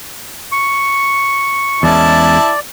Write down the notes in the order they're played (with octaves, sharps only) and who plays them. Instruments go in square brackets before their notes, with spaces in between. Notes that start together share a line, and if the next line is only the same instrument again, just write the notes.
[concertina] C#6
[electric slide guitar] E2 G#3 C#4 [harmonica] E4 A5 [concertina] D5